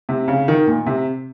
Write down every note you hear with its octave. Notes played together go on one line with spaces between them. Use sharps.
C3
C#3
D#3
A#2
C3